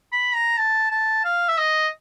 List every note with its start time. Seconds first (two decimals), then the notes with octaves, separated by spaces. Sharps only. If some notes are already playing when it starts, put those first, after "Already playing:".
0.12 B5
0.35 A#5
0.58 A5
0.91 A5
1.25 F5
1.49 E5
1.58 D#5